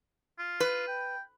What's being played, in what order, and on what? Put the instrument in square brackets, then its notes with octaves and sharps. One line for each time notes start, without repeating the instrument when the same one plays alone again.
[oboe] F4
[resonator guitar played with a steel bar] B4
[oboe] G5